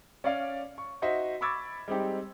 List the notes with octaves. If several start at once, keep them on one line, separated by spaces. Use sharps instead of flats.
C#4 D5 F5
C#6
D#4 F#4 C5 D#5 E5
B5 C#6 D6 E6 G#6 A6
G3 G#3 C4 D#4 G4